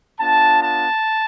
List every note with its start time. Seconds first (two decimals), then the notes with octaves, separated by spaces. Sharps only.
0.19 B3 D4 F4 A5
0.62 A5